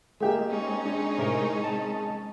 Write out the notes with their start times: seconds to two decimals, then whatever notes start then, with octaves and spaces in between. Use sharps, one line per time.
0.20 G#3 A#3 G4 G#4 E5
0.50 C4 C#4 D#4
0.86 D4
1.18 A2 C3 G#4 A#4
1.64 A5